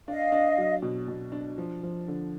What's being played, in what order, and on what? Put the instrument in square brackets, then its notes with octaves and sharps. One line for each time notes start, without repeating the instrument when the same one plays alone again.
[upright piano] D4 [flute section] D#5 F5
[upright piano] D4
F#3
B2
B2
D4
F3
F3
D3